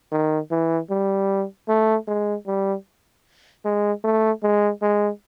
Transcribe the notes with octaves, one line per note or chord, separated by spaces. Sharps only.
D#3
E3
G3
A3
G#3
G3
G#3
A3
G#3
G#3